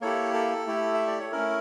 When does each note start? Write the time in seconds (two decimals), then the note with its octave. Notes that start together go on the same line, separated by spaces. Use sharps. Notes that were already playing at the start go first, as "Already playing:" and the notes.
0.01 A#3 E4 G4 A4 C#5
0.34 A4
0.67 A3 E4 G4
0.94 E5
1.07 D5
1.20 C#5
1.32 A3 C#4 E4 A#4